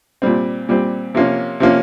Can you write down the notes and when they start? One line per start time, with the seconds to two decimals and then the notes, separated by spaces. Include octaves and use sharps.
0.22 A#2 G3 C4
0.69 A#2 G3 C4
1.15 C3 F3 A#3 C#4
1.60 C3 F3 A#3 C#4